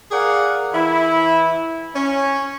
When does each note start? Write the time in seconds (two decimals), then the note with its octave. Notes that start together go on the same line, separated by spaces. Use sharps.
0.11 G#4 A#4 D5 F5 F#5
0.73 E3 E4
1.95 C#4 C#5